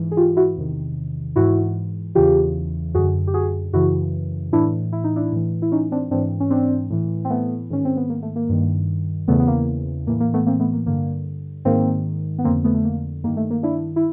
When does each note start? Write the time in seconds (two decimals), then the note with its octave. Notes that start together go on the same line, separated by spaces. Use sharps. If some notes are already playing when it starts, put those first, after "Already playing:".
Already playing: G#2 E3
0.11 G#4
0.17 F4 G4
0.36 E4 F#4
0.57 E2 C3 D#3
1.36 G#2 E3 E4 F#4
2.15 E2 C#3 E3 F4 G4
2.95 F#2 D3 F#4 G#4
3.27 G4
3.34 F#4 G#4
3.73 F#2 C#3 E3 E4 F#4
4.52 A2 E3 D4 E4
4.93 E4
5.04 D#4
5.16 D4 E4
5.32 A2 E3
5.62 E4
5.72 C#4 D#4
5.92 C4 D4
6.11 G#2 E3 C4 D4
6.40 C#4
6.50 C4 D4
6.90 A2 E3
7.25 C4
7.30 A3 B3
7.70 G#2 D#3 C#4
7.85 C4
7.97 B3
8.10 A#3
8.22 A3
8.36 A#3
8.49 G2 D#3
9.28 E2 C#3 E3 A3 B3
9.39 B3
9.47 A#3
10.07 A2 E3 A#3
10.20 A#3
10.34 A3 B3
10.46 A#3 C4
10.60 A3 B3
10.73 A#3
10.86 G2 D3 A#3
11.65 G#2 D#3 A#3 C4
12.38 B3
12.44 F2 D3 A#3 C4
12.64 A3 B3
12.75 A3
12.84 A#3
13.24 G2 D#3 A#3
13.37 A3
13.51 A#3
13.63 D4 E4
13.96 E4